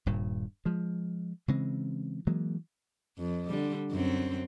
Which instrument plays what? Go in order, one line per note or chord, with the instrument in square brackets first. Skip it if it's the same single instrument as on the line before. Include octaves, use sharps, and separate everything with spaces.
[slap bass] D#1 G2 A#2
F3 G#3
C#3 E3 G#3 C4
E3 F#3 G#3 A#3
[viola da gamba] F2
D3 G3
F#2 C4